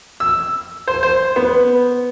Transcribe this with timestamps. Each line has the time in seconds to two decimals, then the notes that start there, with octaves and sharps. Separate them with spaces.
0.20 E6
0.88 C5
1.03 C5
1.36 B3